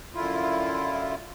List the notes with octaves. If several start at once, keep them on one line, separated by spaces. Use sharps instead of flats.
F#2 D3 E4 F4